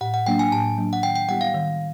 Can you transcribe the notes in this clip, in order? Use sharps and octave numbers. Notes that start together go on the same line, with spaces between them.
A2 F#5
F#5
F#3 A#3 D4 G5
G#5
A2 A5
F#3 A#3 D4
F#5
D#3 G5
G5
G3 B3 E4 G4 F#5
F5
D#3